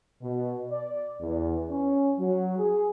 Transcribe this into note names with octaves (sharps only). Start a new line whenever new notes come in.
B2
D5
E2
C#4
F#3
G#4